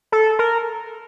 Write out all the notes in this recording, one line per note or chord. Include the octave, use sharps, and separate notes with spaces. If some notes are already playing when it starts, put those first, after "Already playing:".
A4
A#4